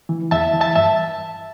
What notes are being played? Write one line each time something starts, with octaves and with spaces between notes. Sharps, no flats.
E3
E2 E5 A5
E3
E5 A5
G2 E5 A5